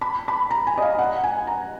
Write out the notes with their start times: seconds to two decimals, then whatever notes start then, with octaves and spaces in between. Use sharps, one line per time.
0.01 B5
0.28 B5
0.51 A#5
0.67 G#5
0.78 D#5
0.82 F5
0.99 F#5
1.24 G#5
1.47 A#5